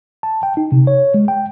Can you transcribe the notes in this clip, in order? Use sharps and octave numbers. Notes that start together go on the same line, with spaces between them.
A5
G5
D#4
C3
C#5
G#3
G5